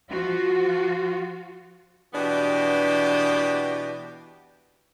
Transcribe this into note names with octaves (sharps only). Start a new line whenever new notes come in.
F3 F4 F#4
B2 E3 B3 D4 G4